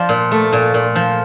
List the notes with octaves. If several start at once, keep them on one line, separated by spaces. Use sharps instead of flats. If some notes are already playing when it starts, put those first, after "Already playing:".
Already playing: F3 C5 D5
A#2
A3
A#2
A#2
F3